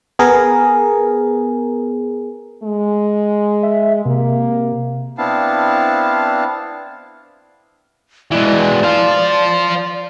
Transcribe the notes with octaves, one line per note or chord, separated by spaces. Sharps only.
B3 G#4 A#4
G#3
E5
C3 A#3
B3 C4 D4 E4 F5 A5
E3 G#3 D5
C5 F5